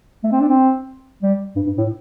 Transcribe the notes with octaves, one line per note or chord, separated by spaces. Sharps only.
A3
C4
D4
C4
G3
G2
G2
A2